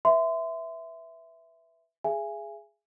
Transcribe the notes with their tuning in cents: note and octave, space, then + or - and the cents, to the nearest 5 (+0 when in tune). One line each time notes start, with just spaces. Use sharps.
B4 +0 E5 +0 C6 -30
G#4 +0 E5 +40 G#5 -5